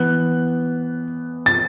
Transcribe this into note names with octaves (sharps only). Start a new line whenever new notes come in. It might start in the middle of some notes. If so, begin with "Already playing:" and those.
Already playing: E3 B3 F#6
A6